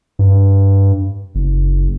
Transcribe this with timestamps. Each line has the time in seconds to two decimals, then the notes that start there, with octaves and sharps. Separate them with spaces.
0.19 G2
1.35 F#1